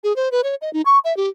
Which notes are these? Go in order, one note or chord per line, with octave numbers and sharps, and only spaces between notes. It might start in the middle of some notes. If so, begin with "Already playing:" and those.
G#4
C5
B4
C#5
D#5
D#4
C#6
E5
G4